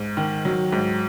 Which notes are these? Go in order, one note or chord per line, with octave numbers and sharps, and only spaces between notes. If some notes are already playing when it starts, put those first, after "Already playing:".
Already playing: G#2
D#3
F#3
G#2